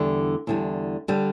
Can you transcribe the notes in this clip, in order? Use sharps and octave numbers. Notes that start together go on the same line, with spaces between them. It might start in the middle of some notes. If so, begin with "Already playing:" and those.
Already playing: E2 D3 G3
E2 D3 G3
D3 G3